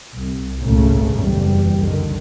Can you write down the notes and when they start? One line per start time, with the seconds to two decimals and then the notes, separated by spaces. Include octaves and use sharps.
0.16 C2
0.62 G#1 C#2 A#2 C#3 A3
1.16 F#1 E2 G3
1.78 C2 D3 D#3